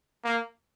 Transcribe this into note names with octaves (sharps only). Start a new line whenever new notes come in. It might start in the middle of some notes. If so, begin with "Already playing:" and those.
A#3